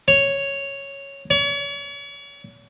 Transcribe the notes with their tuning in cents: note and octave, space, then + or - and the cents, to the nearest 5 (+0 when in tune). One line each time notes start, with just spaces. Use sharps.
C#5 +0
C#5 +40